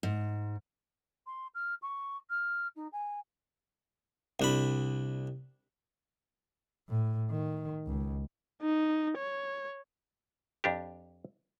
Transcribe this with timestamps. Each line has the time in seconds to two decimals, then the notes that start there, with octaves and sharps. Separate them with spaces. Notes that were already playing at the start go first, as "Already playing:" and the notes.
0.03 G#2
1.26 C6
1.54 F6
1.82 C#6
2.29 F6
2.76 D#4
2.92 G#5
4.40 C2 D4 B5
6.89 A2
7.30 D#3
7.86 C#2
8.63 D#4
9.18 C#5
10.64 F2 D4 G4